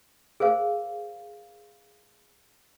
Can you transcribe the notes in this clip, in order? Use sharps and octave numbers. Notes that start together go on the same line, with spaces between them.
G#4 A#4 C5 F5